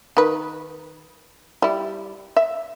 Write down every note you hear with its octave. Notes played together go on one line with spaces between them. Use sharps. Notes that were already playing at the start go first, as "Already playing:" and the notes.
D#3 B4
G3 E4
E5